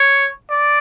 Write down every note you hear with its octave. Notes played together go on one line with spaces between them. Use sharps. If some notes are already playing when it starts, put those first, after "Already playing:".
Already playing: C#5
D5